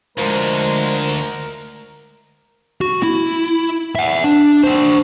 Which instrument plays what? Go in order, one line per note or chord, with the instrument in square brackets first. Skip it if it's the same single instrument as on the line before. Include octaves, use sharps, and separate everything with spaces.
[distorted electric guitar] D2 [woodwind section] F3 G#3 [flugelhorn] A#4
[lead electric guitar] F#4
E4
E5 F#5
D4
D4 C5